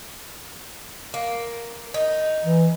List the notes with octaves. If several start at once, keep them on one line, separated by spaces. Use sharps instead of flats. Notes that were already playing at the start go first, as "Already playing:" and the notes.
A#3
D#4
E3